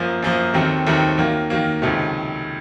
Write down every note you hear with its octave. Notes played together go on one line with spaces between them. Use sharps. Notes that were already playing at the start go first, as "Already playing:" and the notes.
Already playing: F#2 F3 A#3
F#2 F3 A#3
D#2 D#3 F#3 A3 C4
D#2 D#3 F#3 A3 C4
D#3 F#3 A#3
D#3 F#3 A#3
C#2 C3 D#3 F#3 A3